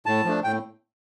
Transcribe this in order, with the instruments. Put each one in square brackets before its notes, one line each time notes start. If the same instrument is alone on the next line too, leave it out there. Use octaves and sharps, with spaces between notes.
[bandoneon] A2 A5
F3 A3 D4
A2 G5